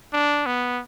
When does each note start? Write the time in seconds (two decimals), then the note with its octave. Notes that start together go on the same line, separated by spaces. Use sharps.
0.13 D4
0.46 B3